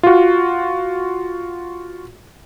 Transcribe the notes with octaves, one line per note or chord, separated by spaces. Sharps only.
F4 F#4